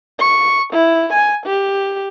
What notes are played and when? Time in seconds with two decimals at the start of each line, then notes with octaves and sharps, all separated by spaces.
0.20 C#6
0.73 E4
1.13 G#5
1.46 G4